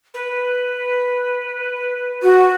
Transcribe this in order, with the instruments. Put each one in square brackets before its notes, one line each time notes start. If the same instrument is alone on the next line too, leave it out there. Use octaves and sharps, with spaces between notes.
[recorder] B4
[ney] F#4